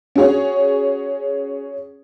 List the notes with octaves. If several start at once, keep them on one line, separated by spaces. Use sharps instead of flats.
C#4 F#4 G#4 C#5